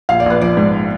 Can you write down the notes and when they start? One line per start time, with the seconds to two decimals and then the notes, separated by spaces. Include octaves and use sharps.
0.09 A#1 F5
0.20 D5
0.26 A#1 B4
0.41 F3 D5
0.57 G#2